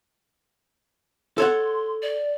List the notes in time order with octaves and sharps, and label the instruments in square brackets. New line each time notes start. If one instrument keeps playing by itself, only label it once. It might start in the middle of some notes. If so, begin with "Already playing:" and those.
[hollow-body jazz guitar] A4 C#5 F#5 [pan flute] C6
[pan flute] D5